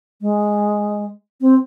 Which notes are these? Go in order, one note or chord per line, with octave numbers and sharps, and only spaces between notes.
G#3
C4